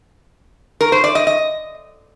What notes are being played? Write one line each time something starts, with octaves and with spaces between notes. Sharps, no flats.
A#4
C5
D5
D#5
D#5